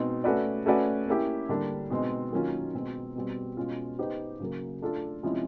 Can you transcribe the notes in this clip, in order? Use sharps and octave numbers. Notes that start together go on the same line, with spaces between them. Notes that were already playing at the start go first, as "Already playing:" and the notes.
Already playing: B2 G#3 C4 D#4
A3 C#4 F#4 B4 D5
A3 C#4 F#4 B4 D5
A#3 C#4 E4 G4
D3 G3 A#3 D4
B2 G#3 C4 D#4
D#3 F#3 A#3 C#4 F4
B2 G#3 C4
B2 G3 C4
B2 G#3 C#4 F4
B3 D#4 G4 C5
C#3 F#3 A#3
A3 D4 F4 A4
C3 F3 G#3 C#4 E4